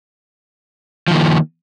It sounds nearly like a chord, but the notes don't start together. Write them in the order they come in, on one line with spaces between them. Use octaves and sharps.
F3 D#3 A#3